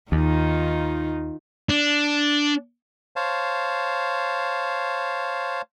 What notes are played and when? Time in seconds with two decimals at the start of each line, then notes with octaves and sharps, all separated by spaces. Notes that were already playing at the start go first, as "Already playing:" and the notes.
0.12 D#2 D#3 D#4 F4
1.69 D4
3.16 C5 C#5 F5 A5